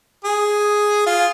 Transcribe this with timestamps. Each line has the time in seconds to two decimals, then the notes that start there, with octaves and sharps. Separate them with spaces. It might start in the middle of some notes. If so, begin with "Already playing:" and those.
0.25 G#4
1.06 F4